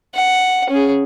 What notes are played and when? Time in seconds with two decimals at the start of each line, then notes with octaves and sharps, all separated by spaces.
0.15 F#5
0.69 C#4 G#4